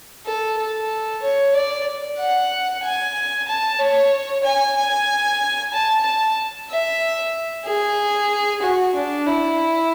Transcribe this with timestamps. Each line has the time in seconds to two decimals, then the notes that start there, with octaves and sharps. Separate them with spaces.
0.26 A4
0.58 A4
1.22 C#5
1.55 D5
2.19 F#5
2.84 G#5
3.48 A5
3.79 C#5
4.44 G#5
4.76 G#5
5.73 A5
6.05 A5
6.70 E5
7.66 G#4
8.62 F#4
8.95 D4
9.26 E4